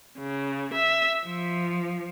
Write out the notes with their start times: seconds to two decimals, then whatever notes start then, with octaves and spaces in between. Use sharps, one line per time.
0.18 C#3
0.73 E5
1.25 F3